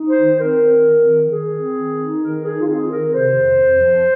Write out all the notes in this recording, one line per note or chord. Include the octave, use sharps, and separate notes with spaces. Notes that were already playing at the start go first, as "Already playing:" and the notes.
Already playing: D#4
C5
D#3
C4 A#4
C4
D#3
D#3
D#3 G#4
C4
D#3
D#4
D#3 A#4
D#4 G#4
F4
C4 G#4
D#3 A#4
C3 C5
F2
F2
F3